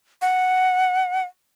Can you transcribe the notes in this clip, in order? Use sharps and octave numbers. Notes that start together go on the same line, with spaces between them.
F#5